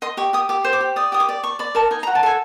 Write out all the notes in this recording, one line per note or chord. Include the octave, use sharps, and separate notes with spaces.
D#5 C6
G4 C#6
G4 D#6
G4 D6
C5
D6
G4
D5 D#6
G4 D#6
D6
D5
D5 C#6
D5 B5
A#4 A5
D#4 G#5
A#5
F#4
A5
A4 G#5